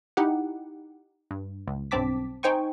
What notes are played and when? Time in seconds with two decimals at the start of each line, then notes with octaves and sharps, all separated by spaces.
0.17 D#4 E4 G4 F#5
1.31 G2
1.68 C#2
1.91 B1 G2 C4 A5 D6 B6
2.43 D#4 C5 G5 G#5 C#6